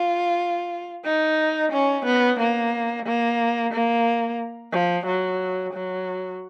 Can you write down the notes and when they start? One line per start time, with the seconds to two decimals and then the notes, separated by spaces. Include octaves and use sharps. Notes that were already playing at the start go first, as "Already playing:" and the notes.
Already playing: F4
1.05 D#4
1.72 C#4
2.05 B3
2.40 A#3
3.06 A#3
3.73 A#3
4.72 F3
5.06 F#3
5.73 F#3